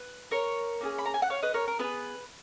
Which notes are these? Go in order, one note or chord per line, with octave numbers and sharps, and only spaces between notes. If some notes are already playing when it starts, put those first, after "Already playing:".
Already playing: B4
A#4 C#5
A#3 C#4 F4 G#4
B5
A#5
G#5
F#5
C#5 F5
B4 D#5
A#4 C#5
A#4
B3 F4 G#4 B4